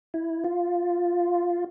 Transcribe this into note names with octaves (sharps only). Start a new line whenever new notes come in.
E4
F4